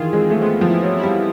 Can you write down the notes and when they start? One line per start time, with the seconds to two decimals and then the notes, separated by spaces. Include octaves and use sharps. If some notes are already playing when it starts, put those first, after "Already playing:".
Already playing: D#3 E3 F4 G#4
0.13 G#3 C4
0.31 A3
0.41 G#3 B3
0.61 F3
0.69 E4
0.82 F#3
0.97 E4
1.03 G3